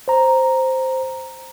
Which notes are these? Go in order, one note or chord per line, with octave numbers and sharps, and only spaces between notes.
C5 A#5